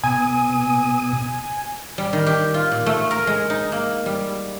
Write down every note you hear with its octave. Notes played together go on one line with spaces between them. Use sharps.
B2 G#5 D#6
G3
D#3
G4
F4
A#2
A3
A#4
G#3
D#4
A#3
G3